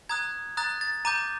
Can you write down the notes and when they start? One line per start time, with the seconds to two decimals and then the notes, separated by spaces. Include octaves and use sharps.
0.09 A#5 D#6 F#6 G#6
0.57 A#5 D#6 F#6 A6
0.81 A6
1.05 A#5 D6 G6 D#7